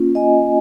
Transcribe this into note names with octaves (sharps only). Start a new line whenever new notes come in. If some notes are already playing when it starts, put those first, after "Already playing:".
Already playing: A#3 C#4 F4
D#5 G#5